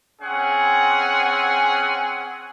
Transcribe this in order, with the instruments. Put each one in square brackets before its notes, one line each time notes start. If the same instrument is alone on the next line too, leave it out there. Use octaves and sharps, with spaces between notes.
[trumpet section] C4 C#4 G#4 F#5